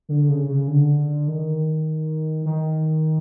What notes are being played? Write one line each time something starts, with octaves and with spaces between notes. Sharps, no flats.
D3
C#3
C#3
D3
D#3
D#3